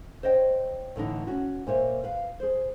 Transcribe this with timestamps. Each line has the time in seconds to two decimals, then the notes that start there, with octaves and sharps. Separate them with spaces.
0.23 C5 C#5 D#5 G5
0.96 A2 D3 E3 D#4
1.27 C#4 F#4
1.67 A#2 C5 C#5 E5
2.04 B4 F5
2.40 G#4 C5